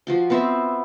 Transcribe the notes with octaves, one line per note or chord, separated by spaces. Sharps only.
F3 F#4 C6
B3 C4 C5 E5